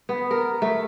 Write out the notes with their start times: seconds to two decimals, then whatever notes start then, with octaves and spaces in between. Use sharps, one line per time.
0.09 B3
0.31 A#4
0.62 A3